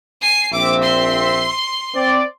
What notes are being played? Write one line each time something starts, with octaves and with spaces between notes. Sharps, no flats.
G#5 C7
A#1 C4 E5 D6
C6
C4 D5